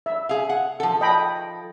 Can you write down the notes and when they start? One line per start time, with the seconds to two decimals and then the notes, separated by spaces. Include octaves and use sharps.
0.06 E5
0.29 G#4 F5
0.49 F#5
0.80 F3 A4
1.01 D#5 G5 B5